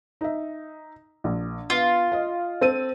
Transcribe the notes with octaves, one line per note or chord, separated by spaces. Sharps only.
D#4 E5
A#1
B3 F4
D#5 F5
C4 A4 D#7